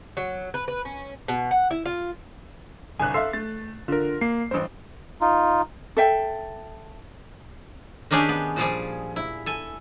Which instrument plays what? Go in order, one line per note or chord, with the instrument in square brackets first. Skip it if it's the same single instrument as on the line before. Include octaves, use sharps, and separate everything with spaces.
[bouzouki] F#3
B4
B4
C#4
B2
F#5
E4
F4
[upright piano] G1 C2 F#6 [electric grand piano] G#5
[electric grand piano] A4 E6 C7 [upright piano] E5 F5 C6
[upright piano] A3 [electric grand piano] A6
[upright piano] D3 [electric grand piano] F4 A#4
[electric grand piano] A#3 [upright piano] C7
[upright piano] A1 G2 [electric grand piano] C5
[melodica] D#4 F4
[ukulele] A4 E5 G5
[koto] D#3 C#4 D4 G4 G#4
B3
A#2 F3 G3 G#4
E4
A4 G#5